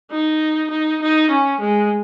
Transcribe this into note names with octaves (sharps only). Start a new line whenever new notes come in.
D#4
D#4
D#4
C#4
G#3